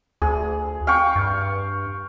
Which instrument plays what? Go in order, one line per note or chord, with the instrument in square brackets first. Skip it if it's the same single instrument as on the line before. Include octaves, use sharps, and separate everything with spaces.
[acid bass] D2 [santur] G#4
[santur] F5 G5 C#6
[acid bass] G2